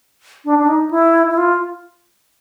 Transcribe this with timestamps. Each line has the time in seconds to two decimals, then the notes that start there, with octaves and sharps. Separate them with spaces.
0.45 D4
0.59 D4
0.68 D#4
0.91 E4
1.30 E4
1.38 F4